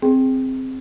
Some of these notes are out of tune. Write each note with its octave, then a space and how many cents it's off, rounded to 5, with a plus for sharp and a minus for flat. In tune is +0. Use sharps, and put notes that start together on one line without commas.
C4 +0 G#4 +0 G5 +0